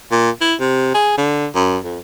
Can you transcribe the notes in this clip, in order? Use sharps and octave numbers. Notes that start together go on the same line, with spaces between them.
A#2
E4
C3
G#4
D3
F#2
F2